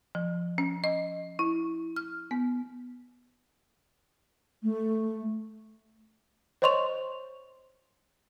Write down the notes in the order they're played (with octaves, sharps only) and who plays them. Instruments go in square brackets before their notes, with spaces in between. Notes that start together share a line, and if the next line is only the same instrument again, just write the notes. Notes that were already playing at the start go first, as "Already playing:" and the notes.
[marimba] F3
C#4
D#5
E4
F6
B3
[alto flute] A3
[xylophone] C5 C#5 D#5 C6 C#6 F7